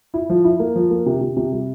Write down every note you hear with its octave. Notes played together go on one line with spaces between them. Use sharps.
E4
F3
E4
A#3
F3
A#3
C3
C3
C3
G3